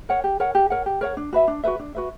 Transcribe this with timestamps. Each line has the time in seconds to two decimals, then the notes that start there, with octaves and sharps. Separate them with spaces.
0.09 A#4 C#5 F#5
0.24 G4
0.40 A#4 C#5 F#5
0.55 G4
0.70 A#4 C#5 F#5
0.86 G4
1.01 A#4 C#5 F#5
1.17 D4
1.33 F#4 B4 E5
1.48 D4
1.63 F#4 B4 E5
1.79 D4
1.95 F#4 B4 E5